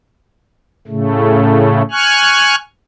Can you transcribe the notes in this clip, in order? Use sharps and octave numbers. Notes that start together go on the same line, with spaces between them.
A2 C#3 A3
G#5 C#6 F6 F#6